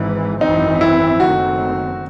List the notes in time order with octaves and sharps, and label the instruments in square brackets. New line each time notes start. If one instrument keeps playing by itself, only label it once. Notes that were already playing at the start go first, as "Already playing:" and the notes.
Already playing: [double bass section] G#1 G#2 E3
[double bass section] G#1 F#2 E3 C4 [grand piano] D#4
[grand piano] E4
[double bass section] F#1 F#2 D#3 A3 C4 [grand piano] F#4